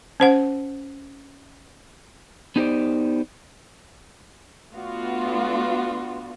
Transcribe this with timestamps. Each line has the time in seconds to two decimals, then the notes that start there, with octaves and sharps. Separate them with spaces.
0.20 C#4 C5 F#5
2.56 B3 D#4 G4 A#4 C5 D5
4.73 A3 B3 D4 F4 F#4